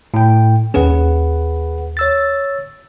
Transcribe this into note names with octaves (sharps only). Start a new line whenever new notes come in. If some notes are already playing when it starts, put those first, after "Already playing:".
A2 G5
D#2 C#4 G#4 B4 F#5
C#5 E6 A6